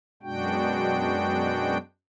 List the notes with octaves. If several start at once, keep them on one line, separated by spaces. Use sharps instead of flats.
F#2 B2 G#3 D4 F#4 G5